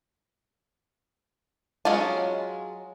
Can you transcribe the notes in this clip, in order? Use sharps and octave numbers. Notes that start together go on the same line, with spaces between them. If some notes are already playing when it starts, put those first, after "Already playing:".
F#3 G#3 C#4 F4